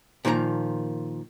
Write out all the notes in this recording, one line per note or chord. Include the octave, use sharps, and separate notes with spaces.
A#2 D#3 F3 B4 A#5